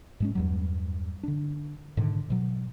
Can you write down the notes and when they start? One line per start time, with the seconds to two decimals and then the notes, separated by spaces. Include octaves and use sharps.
0.20 G#2 G#3 C#4
0.35 E2 G2 F#3
1.23 D3 D4
1.97 G#2 B2 D3 D#3
2.30 B2 F#3